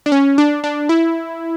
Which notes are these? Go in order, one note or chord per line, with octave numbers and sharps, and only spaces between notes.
D4
C#4
D4
D4
E4